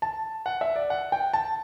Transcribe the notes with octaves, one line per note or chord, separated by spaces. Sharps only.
A5
F#5
E5
D5
F#5
G5
A5